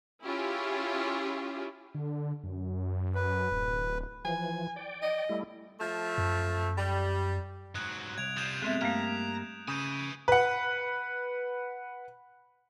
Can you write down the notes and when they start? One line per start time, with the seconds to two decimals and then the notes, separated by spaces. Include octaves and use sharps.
0.24 C#4 E4 F4 G4 G#4
1.94 D3
2.44 F#2
3.15 B4
3.52 D1
4.25 E3 F3 G#5
4.76 D5 G5
5.02 D#5
5.29 G3 A3 E4
5.80 F3 A3
6.18 F#2
6.78 G3
7.75 G#2 F#3 D#6 F#6 G#6
8.18 C2 G#6 D7 F7
8.37 G3 F4 D#6 G6 E7
8.62 G#3 A3 B3 C4 E5
8.81 G2 A3 A#3 G4 F5 A#5
9.68 C#3 E5 G#5 D#6 G6 D#7
10.28 B4 F#5